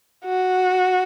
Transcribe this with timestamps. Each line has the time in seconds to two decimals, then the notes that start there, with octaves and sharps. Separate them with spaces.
0.25 F#4